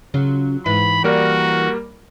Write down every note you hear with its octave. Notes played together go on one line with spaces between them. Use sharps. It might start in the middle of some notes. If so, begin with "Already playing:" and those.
C#3 F#3 F4
G#2 E3 B4 B5
G3 A#3 F#4 A#4 D5